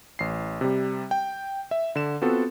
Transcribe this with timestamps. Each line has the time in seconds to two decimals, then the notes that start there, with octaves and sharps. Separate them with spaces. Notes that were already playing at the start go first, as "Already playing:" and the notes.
0.19 A1 C7
0.61 C3 G3
1.11 G5
1.71 E5
1.96 D3 E7
2.22 B3 C4 F4 F#4 A4